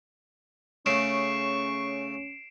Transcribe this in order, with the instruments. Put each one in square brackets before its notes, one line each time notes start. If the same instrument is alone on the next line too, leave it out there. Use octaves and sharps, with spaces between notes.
[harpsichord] C#3 A3 G#4 [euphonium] C#4 [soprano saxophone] C#6 [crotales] C7 D7 E7